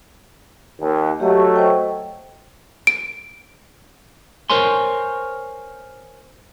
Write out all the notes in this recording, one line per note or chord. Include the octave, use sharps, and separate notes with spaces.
D#2
F#3 A3 G4 D#5
C5 D#5 G5
D7
A#4 C5 C#5 G#5 C6